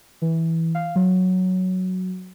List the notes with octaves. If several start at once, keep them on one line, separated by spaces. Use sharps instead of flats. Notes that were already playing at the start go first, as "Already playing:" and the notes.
E3
F5
F#3